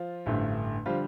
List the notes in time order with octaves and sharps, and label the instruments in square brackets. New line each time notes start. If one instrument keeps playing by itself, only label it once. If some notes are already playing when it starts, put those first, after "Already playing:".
Already playing: [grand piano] F3 F4
A1 G2 D3 A3
D3 F3 G3 F4